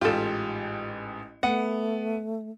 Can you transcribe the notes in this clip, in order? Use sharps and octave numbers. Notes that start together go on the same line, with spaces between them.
A1 G#2 F4 G4 A4
A3 B3 F#5